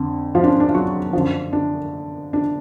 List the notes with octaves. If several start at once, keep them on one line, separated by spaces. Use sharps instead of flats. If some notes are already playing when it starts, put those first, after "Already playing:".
Already playing: F2 D3
F3 F4
D4
C#4
D4
F4
F#3 F#4
F#2 D3 F3
D4
D4